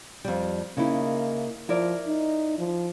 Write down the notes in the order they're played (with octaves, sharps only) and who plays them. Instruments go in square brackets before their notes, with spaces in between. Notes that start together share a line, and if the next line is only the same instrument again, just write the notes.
[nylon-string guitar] F2 G3
[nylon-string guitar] C#3 D#4 E4 [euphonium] A#3
[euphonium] F3 [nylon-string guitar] E4 A#4 D5
[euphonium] D#4
F3